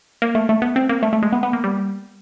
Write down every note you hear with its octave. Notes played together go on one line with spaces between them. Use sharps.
A#3
A3
A3
B3
C4
A#3
A3
A3
G#3
B3
B3
A#3
G3